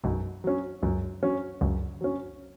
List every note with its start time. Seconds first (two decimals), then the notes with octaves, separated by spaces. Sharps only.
0.04 B1 F#2 B2
0.44 F#3 C#4
0.83 C#2 F#2 C#3
1.23 F#3 C#4
1.61 C#2 F#2 C#3
2.01 F#3 C#4